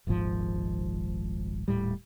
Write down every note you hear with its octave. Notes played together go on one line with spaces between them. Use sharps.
D#1 G#1 G#2 F3
D#1 A2 G3